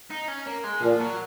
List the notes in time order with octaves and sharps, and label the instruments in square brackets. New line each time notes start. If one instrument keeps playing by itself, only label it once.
[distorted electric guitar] D#4
C#4
A#3
G#3
[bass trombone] A#2 [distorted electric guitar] F3
[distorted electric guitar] F#3